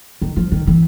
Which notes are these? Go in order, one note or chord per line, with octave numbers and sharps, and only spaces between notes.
D#3
F3
D#3
E3